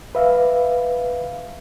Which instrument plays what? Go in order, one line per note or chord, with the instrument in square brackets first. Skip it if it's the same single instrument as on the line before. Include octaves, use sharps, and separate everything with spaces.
[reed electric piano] B4 E5 F5